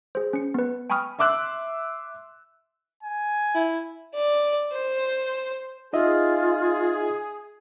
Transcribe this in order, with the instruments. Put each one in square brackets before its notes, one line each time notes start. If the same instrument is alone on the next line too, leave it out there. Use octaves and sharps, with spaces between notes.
[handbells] G#4 C5
C#4 C#7
B3 B4
G5 G#5 B5 C#6 D#6 F6
[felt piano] E5 C6 D6 E6 F#6
[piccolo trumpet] G#5
[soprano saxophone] E4
[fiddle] D5
C5
[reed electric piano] D#4 D#5 E5 [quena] F4 [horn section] G#4